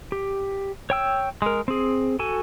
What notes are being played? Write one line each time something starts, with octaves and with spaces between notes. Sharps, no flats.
G4
C#5 G5 E6
G#3 A#4
C4 G#4
F#4 A4 G#5